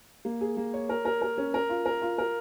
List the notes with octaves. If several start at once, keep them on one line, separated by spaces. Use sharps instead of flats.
A#3
G#4
A#3
C#5
A#4
A#4
A#4
C#4
A#4
F4
A#4
F4
A#4